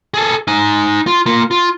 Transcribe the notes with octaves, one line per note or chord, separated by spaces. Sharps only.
G#4 A4
D#4 G#5
F4
A#3 F4
F4